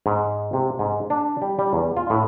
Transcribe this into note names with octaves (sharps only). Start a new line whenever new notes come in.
G#2
C3
G#2
D4
G3
G3
E2
F4
A2